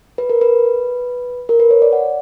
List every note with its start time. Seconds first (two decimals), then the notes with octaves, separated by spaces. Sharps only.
0.18 B4
0.30 A#4
0.41 B4
1.49 A#4
1.60 B4
1.71 C#5
1.82 D5
1.93 F#5